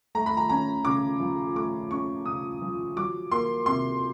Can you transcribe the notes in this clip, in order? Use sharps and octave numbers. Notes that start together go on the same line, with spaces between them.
A3 A#5
B5
A#5
C#4 A#5
C#3 D6
F3
A3 D6
C#4 C#6
C#3 D#6
F3
F#3 D6
A#3 C6
C3 C6